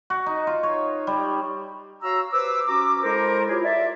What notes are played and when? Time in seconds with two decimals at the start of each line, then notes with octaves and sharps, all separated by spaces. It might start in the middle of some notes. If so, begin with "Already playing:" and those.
0.10 F#4
0.26 D#4
0.47 F4
0.63 C#5
1.07 G3
2.02 F#4 C#5 F5 A#5 E6
2.31 G4 B4 C5 D6 E6
2.66 C#4 F#4 A#5 D6
3.03 G#3 E4 A4 A#4 C5
3.49 E4 F4 G4 G#4 A#4 C#5
3.64 D5 E5